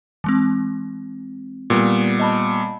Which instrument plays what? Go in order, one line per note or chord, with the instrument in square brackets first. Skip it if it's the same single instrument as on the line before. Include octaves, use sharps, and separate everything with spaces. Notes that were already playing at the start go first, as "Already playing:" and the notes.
[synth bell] E3 G#3 C4
[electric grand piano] A#2 G3 B3
[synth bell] D#5 A5 B5